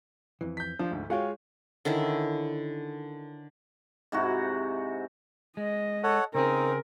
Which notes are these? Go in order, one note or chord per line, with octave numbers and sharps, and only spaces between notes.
F2 E3
G6 B6
F3 D4 F4
D2 G#2
G#3 F4 F#4 C#5 F5 G5
D3 D#3 C#4 E4
G#2 C3 E4 F#4
G#3 D#5
A4 C#5 F#5
C#3 C4 D#4 G#4 A#4